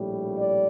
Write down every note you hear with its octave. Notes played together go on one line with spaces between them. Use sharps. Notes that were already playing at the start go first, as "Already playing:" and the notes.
Already playing: A#1 A2 G3
D5